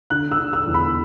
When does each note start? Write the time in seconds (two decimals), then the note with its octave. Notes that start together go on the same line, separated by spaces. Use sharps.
0.10 D3 F#6
0.32 E6
0.38 D3
0.53 E6
0.67 E2
0.74 B5